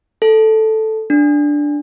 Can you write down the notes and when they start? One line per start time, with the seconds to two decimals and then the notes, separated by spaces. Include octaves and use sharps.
0.22 A4
1.10 D4